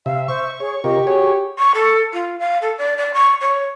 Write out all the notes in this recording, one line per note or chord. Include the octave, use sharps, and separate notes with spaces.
C3 E5 F5
C5 C#6
G#4 C#5
C3 F4 G4 A#4 D#5
F#4 G#4 C#5 C#6
C#6
A4
F4
F5
A4
D5
D5
C#6
C#5